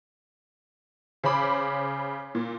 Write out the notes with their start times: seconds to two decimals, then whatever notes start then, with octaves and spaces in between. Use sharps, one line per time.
1.24 C#3 C#4 C5 B5 D6
2.35 A#2